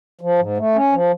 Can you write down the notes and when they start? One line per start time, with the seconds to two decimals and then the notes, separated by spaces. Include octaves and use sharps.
0.21 F3
0.39 G#2
0.57 A3
0.75 C#4
0.92 F3